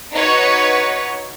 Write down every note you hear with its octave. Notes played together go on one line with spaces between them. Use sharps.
D#4 F#4 B4 C#5